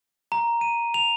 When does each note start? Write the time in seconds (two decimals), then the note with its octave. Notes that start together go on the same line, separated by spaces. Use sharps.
0.32 A#5
0.61 D#7
0.94 F7